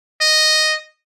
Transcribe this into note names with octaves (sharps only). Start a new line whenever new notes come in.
D#5